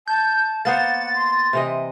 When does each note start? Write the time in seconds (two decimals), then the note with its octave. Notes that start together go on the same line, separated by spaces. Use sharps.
0.08 A5 G6
0.65 A#3 B3 C5 F#5 A6
1.15 C6
1.53 C3 E3 D#5